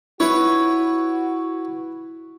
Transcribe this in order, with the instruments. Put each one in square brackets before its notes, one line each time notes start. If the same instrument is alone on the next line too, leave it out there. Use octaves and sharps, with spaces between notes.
[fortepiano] E4 [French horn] F#4 [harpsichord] B4 C#5